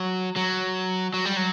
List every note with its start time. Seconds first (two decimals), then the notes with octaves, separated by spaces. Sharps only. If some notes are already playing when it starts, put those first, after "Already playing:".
Already playing: F#3
0.36 F#3
1.14 F#3
1.25 G3
1.37 F#3